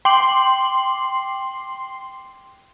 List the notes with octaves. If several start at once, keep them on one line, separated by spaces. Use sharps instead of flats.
G5 C6 D6 F#7